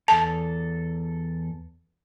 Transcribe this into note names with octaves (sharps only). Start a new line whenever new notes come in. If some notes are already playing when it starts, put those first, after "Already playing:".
E2 A4 A5